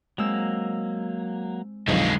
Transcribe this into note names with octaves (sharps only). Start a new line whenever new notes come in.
F#3 G#3 A#3 C4 E6
B1 F2 D3 G#3 F5